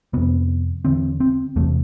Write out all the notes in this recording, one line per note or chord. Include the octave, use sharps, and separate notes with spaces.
F2 C3 B3
E2 D3 C4
C4
E2 C3 A3